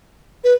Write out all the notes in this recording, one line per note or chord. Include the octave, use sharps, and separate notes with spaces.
B4